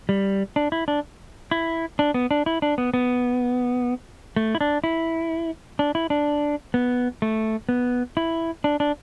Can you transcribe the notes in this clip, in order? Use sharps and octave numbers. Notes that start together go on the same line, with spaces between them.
G3
D4
E4
D4
E4
D4
B3
D4
E4
D4
B3
B3
A3
E4
D4
E4
D4
E4
D4
B3
A3
B3
E4
D4
D4